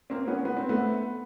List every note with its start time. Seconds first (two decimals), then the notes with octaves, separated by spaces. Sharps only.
0.10 A#3 C4
0.28 B3 C#4
0.45 B3
0.57 C4
0.69 A3 B3